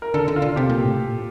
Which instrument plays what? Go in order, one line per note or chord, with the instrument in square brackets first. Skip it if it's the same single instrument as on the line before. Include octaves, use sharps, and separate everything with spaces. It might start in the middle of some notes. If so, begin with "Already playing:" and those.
[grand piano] A#4
[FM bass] D3 [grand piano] A4
[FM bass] D3
[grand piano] F4
[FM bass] D3
[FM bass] C3 [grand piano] G4
[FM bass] A#2
A2
A#2